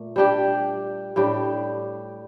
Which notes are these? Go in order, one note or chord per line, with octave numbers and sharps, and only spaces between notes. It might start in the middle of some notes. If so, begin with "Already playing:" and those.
Already playing: A#2 A3
G3 D4 G4
A2 G3 D4 G4